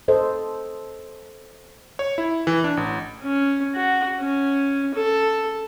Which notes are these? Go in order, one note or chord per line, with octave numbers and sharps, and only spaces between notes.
A4 C5 D#5
C#5
E4
E3
D4
A1
C#4
F#4
C#4
A4